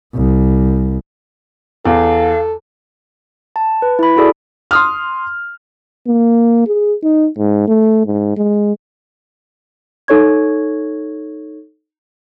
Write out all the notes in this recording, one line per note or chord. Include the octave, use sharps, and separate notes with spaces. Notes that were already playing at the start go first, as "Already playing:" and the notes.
C2
E2 A4 F5
A5
B4
E4 B5
E4 F#4 G#4 A4 D5
C6 D#6 F6
A#3
G#4
D#4
G#2
A3
G#2
G#3
D#4 A4 C#5 C#6 G#6